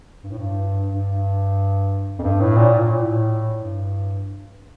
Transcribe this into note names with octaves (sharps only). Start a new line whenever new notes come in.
G2
A2
G2
G2
F2
G2
A2
A#2
A2
A#2
A2
G2